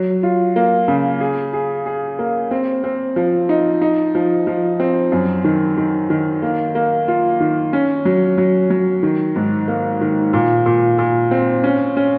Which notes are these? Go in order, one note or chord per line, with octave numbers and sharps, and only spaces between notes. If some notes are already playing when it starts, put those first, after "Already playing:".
Already playing: F#3
F4
A#3
C#3
G#4
G#4
G#4
A#3
C4
C4
F3
D#4
D#4
F3
F3
C4
F#2
D#3
D#3
D#3
A#3
A#3
F4
D#3
C#4
F#3
F#3
F#3
D#3
G#2
A#3
D#3
A#2
A#2
A#2
C4
C#4
C#4